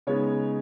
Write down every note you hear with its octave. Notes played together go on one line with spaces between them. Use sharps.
C#3 G#3 B3 D#4 C#5